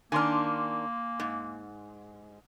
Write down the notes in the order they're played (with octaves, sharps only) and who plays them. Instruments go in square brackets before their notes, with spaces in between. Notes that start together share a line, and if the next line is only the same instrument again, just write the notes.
[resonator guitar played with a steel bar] D#3 D4 [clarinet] A#3 [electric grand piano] G#5 C6 F6
[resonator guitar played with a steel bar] G#2